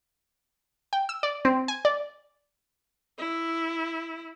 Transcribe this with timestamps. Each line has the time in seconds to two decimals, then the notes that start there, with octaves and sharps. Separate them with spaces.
0.93 G5
1.09 E6
1.23 D5
1.45 C4
1.68 G#5
1.85 D5
3.18 E4